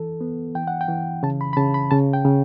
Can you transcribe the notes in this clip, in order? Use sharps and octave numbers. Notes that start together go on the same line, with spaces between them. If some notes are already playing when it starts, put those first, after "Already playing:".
Already playing: E3 A4
B3
E3 G5
F#5
G5
E3
C#3 A5
B5
B5
C#3 A5
B5
C#3 A5
G5
C#3